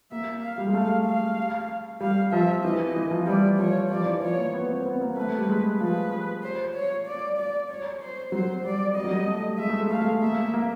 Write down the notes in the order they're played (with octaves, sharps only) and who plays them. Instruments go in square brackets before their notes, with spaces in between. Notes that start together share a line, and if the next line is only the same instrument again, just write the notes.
[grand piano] A#3 [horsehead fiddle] E5
[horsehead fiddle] F5
[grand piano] G3
G#3
[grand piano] A3 [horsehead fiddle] F5
[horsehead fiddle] F5
[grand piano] G3 [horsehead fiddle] F5
[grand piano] F3 [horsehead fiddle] E5
[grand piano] E3 [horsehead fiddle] D#5
[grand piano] E3
F3
[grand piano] G3 [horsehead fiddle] D5
[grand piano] F3 [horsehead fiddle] C#5
[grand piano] F3 [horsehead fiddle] D5
[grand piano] E3
[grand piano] F3 [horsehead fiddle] C#5
[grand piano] A#3
B3
C4
B3
A#3
[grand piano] A3 [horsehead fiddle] B4
[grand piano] G3
G#3
[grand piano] F3 [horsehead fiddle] B4
[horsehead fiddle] C5
C#5
D5
D5
C#5
C5
[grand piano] F#3 [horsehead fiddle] C5
[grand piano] G3 [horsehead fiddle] D5
[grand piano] G3 [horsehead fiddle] D#5
[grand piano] F#3
G3
A3
[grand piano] G#3 [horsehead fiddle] E5
[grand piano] A3
G#3
[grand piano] A3 [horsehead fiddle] F5
[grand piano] G#3
[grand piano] A#3 [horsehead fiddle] E5
[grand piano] A#3